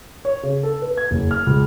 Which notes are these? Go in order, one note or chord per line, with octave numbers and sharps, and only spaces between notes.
C#5
C#3
A4
B4
G#6
F#1
F6
C#2